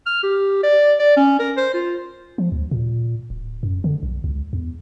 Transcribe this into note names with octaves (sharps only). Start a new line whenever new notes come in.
F6
G4
D5
D5
C#4
A#4
C5
F4
F3
D2
A#2
D1
F#2
D3
B1
C#2
E2